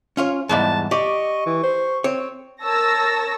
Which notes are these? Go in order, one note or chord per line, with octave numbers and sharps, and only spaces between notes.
C#4 F4 C#5
E2 G#2 G3 A5
G4 D5 D#5 C#6
E3
C5
C4 C#5
A#4 C#5 A5 E6 A#6